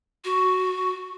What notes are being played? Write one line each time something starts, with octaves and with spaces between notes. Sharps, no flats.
F#4